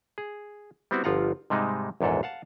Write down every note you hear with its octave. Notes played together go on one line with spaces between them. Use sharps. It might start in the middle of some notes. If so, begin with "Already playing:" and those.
G#4
G3 B3 C4 E4 F#4
G1 F3 F4 F#5 A#5
G#2 C3 G3 G#3 D#4
A#1 E2 G#2 A4
F5 F#5 A5